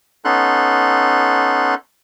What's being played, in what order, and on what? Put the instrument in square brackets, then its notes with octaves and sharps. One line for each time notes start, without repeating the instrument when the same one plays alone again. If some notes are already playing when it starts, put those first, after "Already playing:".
[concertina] B3 C#4 D#4 A4 C6 F#6